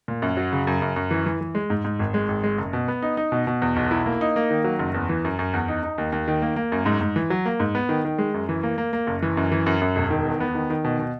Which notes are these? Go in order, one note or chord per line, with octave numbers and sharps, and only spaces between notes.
A#2
F#2
F#3
C#3
F#2
F#2
F#2
E3
E3
E3
G#3
G#2
G#2
G#1
G#3
G#1
G#3
F#1
B2
B3
D#4
D#4
B2
B2
E2
B1
E4
A#3
D#4
A#3
D#3
F#3
F#1
E2
E3
F#2
F#2
E2
D#4
D#4
D#2
D#2
D#3
A#3
A#3
F#2
G#2
G#2
E3
F#3
A#3
G#2
B3
D#3
D#3
G#3
F#2
E3
A#3
A#3
A#3
F#1
E3
F#2
E3
F#2
F#2
E1
D#3
E2
B3
D#3
D#3
B2
B2